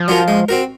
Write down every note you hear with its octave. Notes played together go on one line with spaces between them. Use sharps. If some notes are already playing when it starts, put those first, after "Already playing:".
Already playing: F3
F#3 C#4 F4 A#4
G#3
C4 F#4 A#4